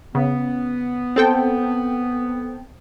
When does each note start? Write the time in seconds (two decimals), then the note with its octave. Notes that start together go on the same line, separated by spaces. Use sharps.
0.15 C#3 B3
1.16 C4 A4 G5